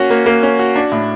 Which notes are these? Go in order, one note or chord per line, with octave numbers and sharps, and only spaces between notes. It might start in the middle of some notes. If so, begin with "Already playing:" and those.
Already playing: A#3 C#4 F#4
A#3
A#3
C#4
F#4
D4
A2